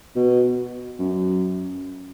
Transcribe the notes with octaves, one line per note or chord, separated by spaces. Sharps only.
B2
F#2